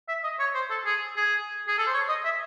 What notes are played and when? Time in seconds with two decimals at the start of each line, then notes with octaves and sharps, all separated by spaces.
0.08 E5
0.24 D#5
0.39 C#5
0.55 C5
0.70 A4
0.86 G#4
1.17 G#4
1.68 G#4
1.78 A4
1.87 C5
1.93 C#5
2.09 D#5
2.24 E5